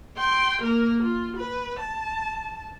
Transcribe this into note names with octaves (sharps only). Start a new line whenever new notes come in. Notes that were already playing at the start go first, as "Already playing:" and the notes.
G5 C6
A#3 A#4
F4
B4
A5